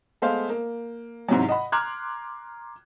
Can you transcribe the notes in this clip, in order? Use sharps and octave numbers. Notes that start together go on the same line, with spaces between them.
G#3 A3 B3 C5 F5
A#3
G#2 C3 E3 F#3
D#5 F#5 B5
A#5 C6 D6 F6 F#6 G#6